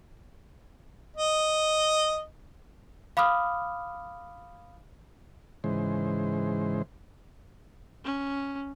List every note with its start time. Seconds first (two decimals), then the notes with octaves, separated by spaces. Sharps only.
1.16 D#5
3.17 F5 B5 D6 D#6 F6
5.64 G#2 C#3 E3 G#3 C5
8.05 C#4